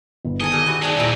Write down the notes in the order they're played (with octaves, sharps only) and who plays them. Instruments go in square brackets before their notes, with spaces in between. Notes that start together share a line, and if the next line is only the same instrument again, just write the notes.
[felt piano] G1
[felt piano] D#3 [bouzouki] G#4 A4 G#5 [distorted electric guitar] D#5
[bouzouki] C#3 F#3 A#3
E3 F#4
[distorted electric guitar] E3 G#3 [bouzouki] D4 D#4 G#4
[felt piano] D#1 [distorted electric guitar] F2 C3 [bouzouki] F#3 E4